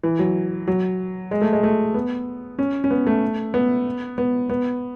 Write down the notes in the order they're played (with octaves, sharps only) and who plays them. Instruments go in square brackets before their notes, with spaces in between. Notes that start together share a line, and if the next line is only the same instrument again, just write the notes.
[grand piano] E3
F#3
F#3
G#3
A3
G#3
A3
B3
C#4
C#4
B3
A3
B3
B3
B3